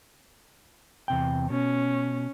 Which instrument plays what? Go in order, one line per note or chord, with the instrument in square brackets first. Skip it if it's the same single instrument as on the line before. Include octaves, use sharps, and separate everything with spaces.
[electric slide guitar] E2 C3 G5
[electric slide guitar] B2 [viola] C#4